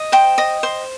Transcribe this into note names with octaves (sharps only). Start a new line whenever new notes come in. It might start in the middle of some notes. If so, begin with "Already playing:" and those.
Already playing: D#5
C5 G5
D#5
C5